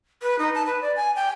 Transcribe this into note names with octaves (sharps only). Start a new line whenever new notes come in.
B4
D#4
A5
B4
D5
G#5
G5